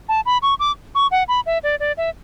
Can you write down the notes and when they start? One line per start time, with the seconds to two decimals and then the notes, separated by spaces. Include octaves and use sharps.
0.09 A5
0.26 B5
0.42 C#6
0.60 D6
0.95 C#6
1.11 F#5
1.28 B5
1.46 E5
1.63 D5
1.80 D5
1.97 E5